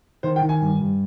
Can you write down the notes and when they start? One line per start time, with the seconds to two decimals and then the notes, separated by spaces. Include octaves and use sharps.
0.23 D#3 C5
0.36 G5
0.41 D#3
0.49 G#5
0.61 G2
0.81 G2